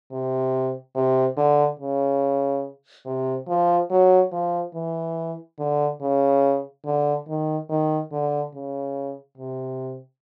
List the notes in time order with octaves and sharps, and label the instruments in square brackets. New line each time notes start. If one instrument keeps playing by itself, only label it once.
[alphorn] C3
C3
D3
C#3
C3
F3
F#3
F3
E3
D3
C#3
D3
D#3
D#3
D3
C#3
C3